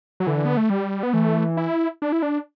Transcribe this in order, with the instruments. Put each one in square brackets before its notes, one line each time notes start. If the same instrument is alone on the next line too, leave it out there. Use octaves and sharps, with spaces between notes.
[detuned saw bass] F#3
[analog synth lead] D3 [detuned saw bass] E3
[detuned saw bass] B3
A3
G3
B3
[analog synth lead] E3 [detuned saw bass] A3
[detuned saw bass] E4
D4
E4
D4